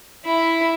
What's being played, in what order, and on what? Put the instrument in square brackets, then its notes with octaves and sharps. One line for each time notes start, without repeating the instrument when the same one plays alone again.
[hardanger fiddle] E4